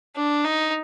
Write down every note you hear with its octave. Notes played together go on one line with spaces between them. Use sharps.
D4
D#4